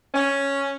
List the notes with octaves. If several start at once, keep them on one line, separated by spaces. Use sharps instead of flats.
C#4